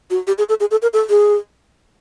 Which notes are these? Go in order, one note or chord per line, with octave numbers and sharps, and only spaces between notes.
F#4
G4
G#4
A4
G#4
A4
A#4
A4
G#4